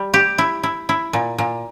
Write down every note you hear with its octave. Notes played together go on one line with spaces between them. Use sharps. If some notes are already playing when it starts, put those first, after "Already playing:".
Already playing: G3
G4
E4
E4
E4
A#2
A#2